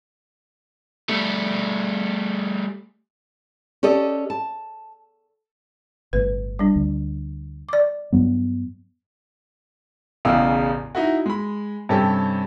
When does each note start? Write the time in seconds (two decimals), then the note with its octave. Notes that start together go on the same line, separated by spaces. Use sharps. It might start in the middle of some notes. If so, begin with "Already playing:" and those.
1.09 G3 A3
3.83 C#4 G4 A4 D5 D#5
4.30 A5
6.13 G1 A2 B4
6.59 G3 D4
6.76 D2
7.69 D5 D6
8.12 G2 F#3 B3
10.25 E1 A1 E2 C#3 F5 E6
10.95 D#4 E4 F#4
11.26 G#3 B5
11.89 G2 C3 C#4 G4 A4